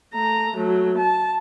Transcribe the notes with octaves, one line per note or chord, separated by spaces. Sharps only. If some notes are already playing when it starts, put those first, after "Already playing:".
A3 A#5
F#3 A3
A5